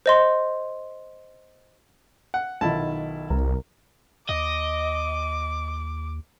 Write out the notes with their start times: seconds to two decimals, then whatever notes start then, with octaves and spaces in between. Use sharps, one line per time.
0.06 C5 D#5 C6
2.34 F#5
2.61 B1 B2 D#3 E4 F4 A5
3.30 C2 A#4
4.29 D#2 D#5 D6